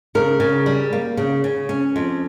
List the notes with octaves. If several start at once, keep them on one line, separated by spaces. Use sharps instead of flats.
C#3 A#4
C#3
G3
A#3
C#3
C#3
C#4
F2